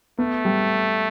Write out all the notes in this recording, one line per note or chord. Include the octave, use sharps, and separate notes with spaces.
A3 B3
G3